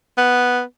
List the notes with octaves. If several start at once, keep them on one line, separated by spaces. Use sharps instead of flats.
B3